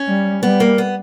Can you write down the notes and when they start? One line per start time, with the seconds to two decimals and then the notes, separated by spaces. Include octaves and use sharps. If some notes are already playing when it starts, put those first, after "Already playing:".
Already playing: C#4
0.08 G3
0.43 G3 B3
0.60 A#3
0.78 B3